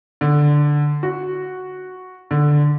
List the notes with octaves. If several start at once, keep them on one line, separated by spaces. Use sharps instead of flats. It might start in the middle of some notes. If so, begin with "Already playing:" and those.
D3
F#4
D3